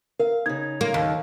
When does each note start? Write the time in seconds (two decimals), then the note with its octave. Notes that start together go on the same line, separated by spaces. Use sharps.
0.20 A#4 F5
0.46 C#3 D#4 G#6
0.81 A#3
0.94 D#2